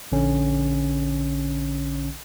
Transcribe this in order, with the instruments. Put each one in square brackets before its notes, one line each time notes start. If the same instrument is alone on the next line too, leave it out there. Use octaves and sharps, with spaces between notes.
[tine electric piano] A#1 D3 C#4